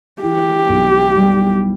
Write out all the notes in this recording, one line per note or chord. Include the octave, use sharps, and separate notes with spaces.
E3 G4
B1
G3